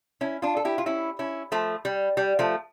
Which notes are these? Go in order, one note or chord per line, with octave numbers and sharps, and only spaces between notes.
C#4 E4
D4 F4
A4
E4 G4
F4
C#4 E4
C#4 E4
F3 A3
G3
G3
F3 A3